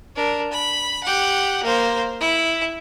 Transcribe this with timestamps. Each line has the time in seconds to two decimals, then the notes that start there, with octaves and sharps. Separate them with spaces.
0.16 D4 A#4
0.52 B5
1.03 G4 F#5
1.63 A#3 C5
2.21 E4